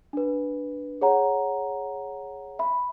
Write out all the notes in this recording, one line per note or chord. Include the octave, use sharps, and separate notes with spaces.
D4 B4
G#4 C#5 F#5 A#5
E5 B5